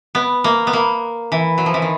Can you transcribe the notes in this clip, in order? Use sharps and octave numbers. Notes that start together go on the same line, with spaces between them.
B3
A#3
B3
A#3
E3
F#3
F3
E3
D#3